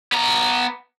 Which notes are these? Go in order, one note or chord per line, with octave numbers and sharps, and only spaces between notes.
B3 A#5